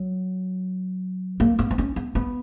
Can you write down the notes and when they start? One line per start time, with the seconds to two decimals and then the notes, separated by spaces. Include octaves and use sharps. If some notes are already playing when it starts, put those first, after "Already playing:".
Already playing: F#3
1.40 A#3
1.59 B3
1.71 B3
1.78 C#4
1.96 B3
2.15 B3